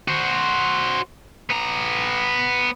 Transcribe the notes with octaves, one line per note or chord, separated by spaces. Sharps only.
F#4 C5
B3 A#5